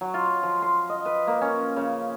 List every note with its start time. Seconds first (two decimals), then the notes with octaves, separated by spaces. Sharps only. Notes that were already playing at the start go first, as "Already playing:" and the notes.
0.01 F#3
0.14 F4
0.43 F3
0.62 C6
0.89 D#5
1.05 B4
1.27 A#3
1.41 C#4
1.76 C#3